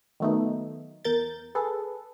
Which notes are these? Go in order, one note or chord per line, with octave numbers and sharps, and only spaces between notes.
D#3 F#3 A3 B3 D#4
E2 A#4 G6 A6
G#4 A4 B4